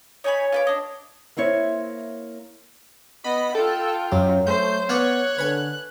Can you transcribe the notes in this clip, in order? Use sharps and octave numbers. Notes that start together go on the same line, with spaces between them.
D#4 C#5 G#5 B5
F4 B4 D6
D4 D#5
A#3 C4 E4 C#5
B3 D#5 B5
F4 A4 G5
F#2 F#3
A3 C5 G6
B3 C#5 D5 F5 F#5 F#6
D3 B4 G#5